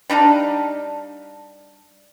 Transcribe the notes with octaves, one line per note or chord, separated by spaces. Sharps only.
G3 D4 D#4 F5